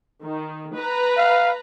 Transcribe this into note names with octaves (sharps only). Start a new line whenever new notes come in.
D#3
B4 A#5
F5